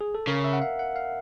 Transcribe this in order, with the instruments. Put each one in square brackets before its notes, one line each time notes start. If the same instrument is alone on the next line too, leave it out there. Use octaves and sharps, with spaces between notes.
[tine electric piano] G#4
A4
[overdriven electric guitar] C#3 [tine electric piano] A#4
[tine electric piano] E5
F#5
F5
F#5
F5